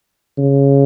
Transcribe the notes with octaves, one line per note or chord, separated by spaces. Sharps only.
C#3